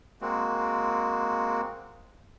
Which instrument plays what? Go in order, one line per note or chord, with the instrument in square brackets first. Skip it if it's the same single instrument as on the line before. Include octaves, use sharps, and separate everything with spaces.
[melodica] G#3 A#3 C4 F#4